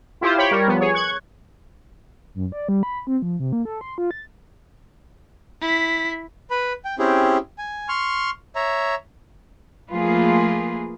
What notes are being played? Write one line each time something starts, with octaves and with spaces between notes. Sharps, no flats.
E4 F4 G4 C5
G4 C#5 G5 B5
G3 A#4 C#5
F3 B3
G#4 C#5
C#6 F#6 G#6
F#2
D5
G3
B5
C4
F3
C3
A#3
A4
C6
F4
A6
E4 B6
B4 B5
G5
C4 C#4 E4 G4 G#4
G#5
C6 C#6 F6
C#5 E5 A#5
F3 A3 A#3 F4 G#4 B4